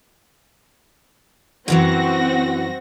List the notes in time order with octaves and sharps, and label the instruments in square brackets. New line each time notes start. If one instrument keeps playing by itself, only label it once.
[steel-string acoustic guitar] F#2 E3 F#3 [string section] C4 F#4 A#6